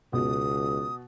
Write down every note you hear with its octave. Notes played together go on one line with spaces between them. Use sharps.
C#2 B2 D#6